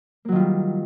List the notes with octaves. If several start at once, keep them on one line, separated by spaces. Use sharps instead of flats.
D#3 F#3 G3 A#3 F4